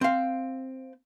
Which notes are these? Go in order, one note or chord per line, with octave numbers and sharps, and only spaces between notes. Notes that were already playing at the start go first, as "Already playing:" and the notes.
C4 F5